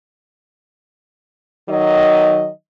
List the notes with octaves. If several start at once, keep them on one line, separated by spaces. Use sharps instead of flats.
D#3 F#3 D#4 D#5